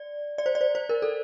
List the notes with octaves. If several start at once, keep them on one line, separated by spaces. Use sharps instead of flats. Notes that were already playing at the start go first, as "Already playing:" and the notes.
Already playing: D5
D5
C5
D5
C5
C5
A#4
A4